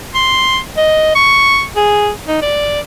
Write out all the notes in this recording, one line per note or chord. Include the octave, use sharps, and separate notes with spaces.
C6
D#5
C#6
G#4
D#4
D5